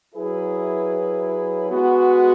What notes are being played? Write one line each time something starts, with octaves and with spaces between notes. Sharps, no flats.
F#3 E4 G#4 B4
G#3 B3 F#4